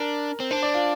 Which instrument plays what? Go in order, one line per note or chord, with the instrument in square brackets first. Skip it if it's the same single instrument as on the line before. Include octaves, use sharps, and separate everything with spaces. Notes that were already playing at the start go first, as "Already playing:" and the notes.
Already playing: [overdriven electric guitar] D4 [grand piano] A#4
[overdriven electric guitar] C4
[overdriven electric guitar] D4 [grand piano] C5
[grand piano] D5
F4